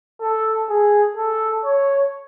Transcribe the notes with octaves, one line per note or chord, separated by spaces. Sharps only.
A4
G#4
A4
C#5